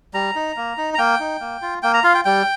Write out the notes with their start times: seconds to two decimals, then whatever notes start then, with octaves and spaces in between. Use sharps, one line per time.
0.14 G3 A#5
0.35 D#4
0.57 A#3
0.78 D#4
0.94 A#5
0.98 A#3 G5
1.20 D#4
1.40 A#3
1.62 F4
1.82 A#3 G5
1.94 A#5
2.04 F4 F5
2.15 G5
2.25 G3 G5